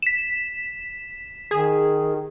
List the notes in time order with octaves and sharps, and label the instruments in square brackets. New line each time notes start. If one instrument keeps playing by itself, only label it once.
[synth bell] B6 E7
[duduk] D#3 [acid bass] G#4